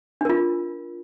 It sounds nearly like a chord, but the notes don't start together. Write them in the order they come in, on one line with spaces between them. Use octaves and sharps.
D4 A#4 F4